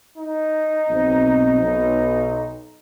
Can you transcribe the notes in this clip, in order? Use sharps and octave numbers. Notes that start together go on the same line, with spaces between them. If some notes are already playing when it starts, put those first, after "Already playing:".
D#4
B1 C4
B1